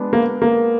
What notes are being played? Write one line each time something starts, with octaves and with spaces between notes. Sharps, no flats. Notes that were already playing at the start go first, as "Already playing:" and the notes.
Already playing: G#3 B3 D4 F#4
A#3
A#3